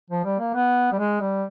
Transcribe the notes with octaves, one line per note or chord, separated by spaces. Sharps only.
F3
G3
A#3
B3
G3
G#3
G3